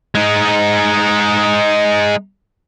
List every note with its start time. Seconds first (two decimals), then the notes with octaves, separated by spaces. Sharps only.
0.15 G#3 D#4